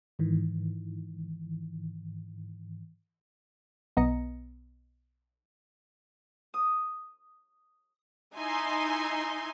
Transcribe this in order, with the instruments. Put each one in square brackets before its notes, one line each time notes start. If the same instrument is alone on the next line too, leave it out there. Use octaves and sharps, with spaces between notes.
[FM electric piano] G#2 D#3 E3
[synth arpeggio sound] B1 B3 D#5 A#5 A#6 C#7
[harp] D#6
[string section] D#4 E4 G#5 C6